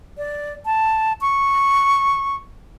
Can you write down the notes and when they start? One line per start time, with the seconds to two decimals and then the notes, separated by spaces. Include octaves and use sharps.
0.18 D5
0.66 A5
1.21 C#6